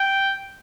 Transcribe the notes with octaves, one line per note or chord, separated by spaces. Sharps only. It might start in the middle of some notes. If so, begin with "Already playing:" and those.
Already playing: G5